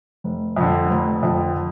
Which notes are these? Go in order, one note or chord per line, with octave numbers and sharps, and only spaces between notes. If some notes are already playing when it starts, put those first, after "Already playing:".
F1
F2 D3
F1
F2 D3